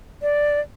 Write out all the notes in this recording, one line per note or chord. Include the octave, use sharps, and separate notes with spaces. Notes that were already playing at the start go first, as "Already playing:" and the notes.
D5